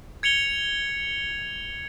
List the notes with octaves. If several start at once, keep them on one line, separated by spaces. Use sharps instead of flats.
G#6 C#7 F7 G7